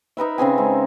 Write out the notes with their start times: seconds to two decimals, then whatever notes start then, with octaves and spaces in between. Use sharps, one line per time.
0.17 D#4 A#4 B4 E5
0.38 C#3 C4 G#4 G#5
0.58 G#3